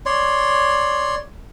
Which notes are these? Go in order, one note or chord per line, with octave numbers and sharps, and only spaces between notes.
C#5 D5 C6